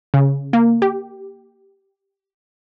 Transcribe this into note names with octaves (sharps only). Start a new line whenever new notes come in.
C#3
A#3
G4